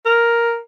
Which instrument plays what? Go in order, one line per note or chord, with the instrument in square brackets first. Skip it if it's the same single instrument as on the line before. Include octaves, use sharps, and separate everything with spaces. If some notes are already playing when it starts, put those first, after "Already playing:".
[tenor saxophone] A#4